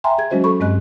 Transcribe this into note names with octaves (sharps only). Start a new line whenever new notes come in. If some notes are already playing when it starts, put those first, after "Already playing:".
E5 G5 G#5 A#5 C6
G#4 G#6
F#3 G#3 C#4 F#4 C5 D#5
A4 B5 C#6
G2 G#3 C4 D#5 F#6